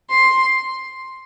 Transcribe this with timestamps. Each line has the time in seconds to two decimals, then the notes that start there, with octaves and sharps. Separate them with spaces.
0.10 C6